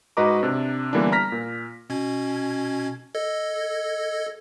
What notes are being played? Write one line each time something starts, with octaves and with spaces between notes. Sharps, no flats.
G#2 F#4 B4 D#5 A#5 D6
C3 D4
D3 E3 G3 A#3 B3 D4
A#5 F6 A#6 B6
A#2
B2 C#4 G#6
A4 D#5 G#6